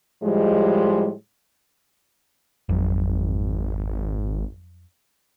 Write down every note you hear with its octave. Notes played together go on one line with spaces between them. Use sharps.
A2 F3 G3 G#3
G#1 F2 F#3